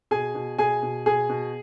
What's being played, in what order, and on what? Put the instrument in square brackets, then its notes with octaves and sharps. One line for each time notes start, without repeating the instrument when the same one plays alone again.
[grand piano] B2 G#4 G#5
B2
B2 G#4 G#5
B2
B2 G#4 G#5
B2